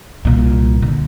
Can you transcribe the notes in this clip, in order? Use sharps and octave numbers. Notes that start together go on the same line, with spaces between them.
C2 A#2
D3